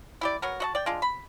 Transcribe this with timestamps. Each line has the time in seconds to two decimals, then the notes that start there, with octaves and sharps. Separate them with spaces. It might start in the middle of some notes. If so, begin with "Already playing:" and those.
0.21 E4 G4 D5
0.42 F#3 B3 A#4
0.60 F#4 D#5 A5
0.75 D5 G5
0.86 G#3 D4 F4
1.02 B5